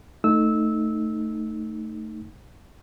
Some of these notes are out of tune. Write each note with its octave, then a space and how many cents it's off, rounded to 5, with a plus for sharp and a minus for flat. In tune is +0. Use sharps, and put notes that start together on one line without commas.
A3 +10 D#4 +0 E6 -15